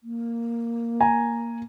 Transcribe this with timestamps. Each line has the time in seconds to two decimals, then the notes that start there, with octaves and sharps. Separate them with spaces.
0.03 A#3
1.01 G#5 A#5